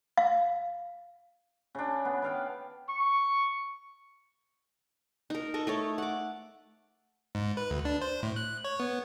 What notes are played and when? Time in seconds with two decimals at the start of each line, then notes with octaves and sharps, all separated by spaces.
0.17 F5
1.75 C#3 D4
2.05 B3
2.22 B4 F5 G5
2.89 C#6
5.30 D#4 A#4
5.54 A4 D#5 C#6
5.67 A3 A4 C#5
5.98 F#5 D6
7.35 G#2
7.57 B4
7.70 D2
7.85 D4
8.02 C5
8.23 A2
8.36 F#6
8.64 C#5
8.80 B3